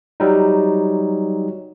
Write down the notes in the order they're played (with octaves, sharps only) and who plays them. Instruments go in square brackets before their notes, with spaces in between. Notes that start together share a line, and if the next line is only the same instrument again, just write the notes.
[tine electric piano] F#3 G3 D#4